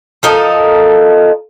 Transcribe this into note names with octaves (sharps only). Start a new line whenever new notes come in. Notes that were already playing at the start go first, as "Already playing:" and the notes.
F3 D#4 A4 A#4